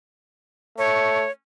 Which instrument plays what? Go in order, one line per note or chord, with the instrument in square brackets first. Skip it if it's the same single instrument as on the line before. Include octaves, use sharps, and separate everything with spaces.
[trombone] A3 [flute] C#5